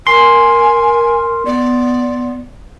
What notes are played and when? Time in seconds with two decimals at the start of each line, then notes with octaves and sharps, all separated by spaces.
0.07 A#4 G#5 C6
1.46 B3 D5